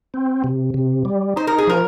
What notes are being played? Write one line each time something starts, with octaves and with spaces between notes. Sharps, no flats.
C4
C3
C3
G3
D#4 C5
A#4
G#4
F3 A#4